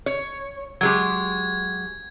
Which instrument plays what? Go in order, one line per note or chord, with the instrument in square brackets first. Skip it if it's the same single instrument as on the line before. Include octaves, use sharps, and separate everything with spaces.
[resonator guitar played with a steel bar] C#5
[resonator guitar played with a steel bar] F#3 G#3 G4 [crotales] G#6